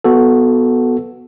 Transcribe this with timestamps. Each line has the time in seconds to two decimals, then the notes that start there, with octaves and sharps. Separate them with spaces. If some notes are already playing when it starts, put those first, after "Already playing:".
0.04 B3 F#4 A4